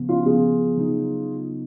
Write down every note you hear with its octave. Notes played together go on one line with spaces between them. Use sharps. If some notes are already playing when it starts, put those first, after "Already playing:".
Already playing: C#3 F3 B3
C#4 F4
C#3 F3 B3 F4 G#4
C#3 F#3 B3 D#4